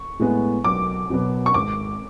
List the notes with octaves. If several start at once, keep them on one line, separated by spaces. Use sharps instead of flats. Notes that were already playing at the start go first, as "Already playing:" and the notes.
Already playing: C#6
A2 G#3 B3
B1 D6
B2 F#3 B3
C#6
G#1 D6